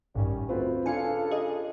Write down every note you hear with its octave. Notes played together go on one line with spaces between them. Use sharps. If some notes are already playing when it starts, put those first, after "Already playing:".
A1 G2 D#3 G3 C#4
D2 C4 F4 B4
C#3 D4 F4 A4 F5 G#5 C#7
G#4 D#5